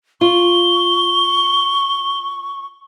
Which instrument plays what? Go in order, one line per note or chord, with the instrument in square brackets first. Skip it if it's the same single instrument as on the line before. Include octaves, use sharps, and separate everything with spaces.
[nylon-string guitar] F4 [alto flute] C#6 [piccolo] G7